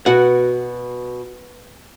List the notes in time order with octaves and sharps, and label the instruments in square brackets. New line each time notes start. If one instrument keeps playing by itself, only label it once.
[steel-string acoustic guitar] B2 [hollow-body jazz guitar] F#4 F#5